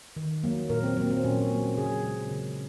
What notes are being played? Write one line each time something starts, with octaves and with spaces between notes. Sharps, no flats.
D#3
F#3 A#3
A#2 A#4
C4
F#3 A#3 C4
C4
A#2 C#4
F#3 A#3
C#3 G#4
G#3
C#3